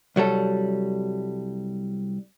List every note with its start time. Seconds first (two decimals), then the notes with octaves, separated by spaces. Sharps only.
0.16 C2 F#3 G3 A4